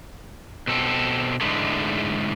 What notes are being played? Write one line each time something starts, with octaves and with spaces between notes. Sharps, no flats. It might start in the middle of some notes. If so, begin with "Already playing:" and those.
B2 C4 A4
G#2 D3 E3 G#3 A3